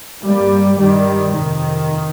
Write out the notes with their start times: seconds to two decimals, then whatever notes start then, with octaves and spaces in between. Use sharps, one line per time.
0.23 G2 G3 A#3
0.78 G2 D#3 G3
1.34 F2 C3 D#3